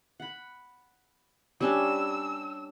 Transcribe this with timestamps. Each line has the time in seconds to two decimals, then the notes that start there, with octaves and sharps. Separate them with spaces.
0.20 F#5 B5
1.61 G3 C#4 D4 E6